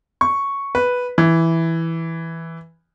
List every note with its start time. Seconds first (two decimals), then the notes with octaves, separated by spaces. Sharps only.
0.21 C#6
0.75 B4
1.18 E3